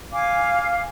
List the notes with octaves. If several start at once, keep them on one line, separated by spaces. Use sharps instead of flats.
F5 G#5 D6